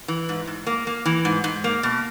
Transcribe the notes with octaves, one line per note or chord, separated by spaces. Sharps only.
E3
G#2
G#2
A#3
A#3
E3
G#2
G#2
A#3
B2